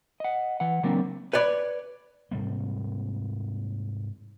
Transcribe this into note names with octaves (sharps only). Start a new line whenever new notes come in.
D#5 F#5
E3 F#5
C#3 F#3 A#3 C4 D4
B4 C#5 D5 B5
G#2 C3 G3 A#3